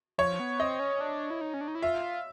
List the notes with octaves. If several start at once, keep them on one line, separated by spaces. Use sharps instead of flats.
F3 C#5
B3
C4 D#5
C#4
D4
E4
D#4
C#4
D4
D#4
E4
F4 E5